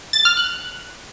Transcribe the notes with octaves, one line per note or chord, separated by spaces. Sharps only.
A6
F6
F#6